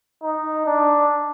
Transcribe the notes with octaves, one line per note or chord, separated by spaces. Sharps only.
D#4
D4